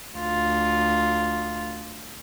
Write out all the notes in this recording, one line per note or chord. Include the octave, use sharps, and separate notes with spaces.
D2 F4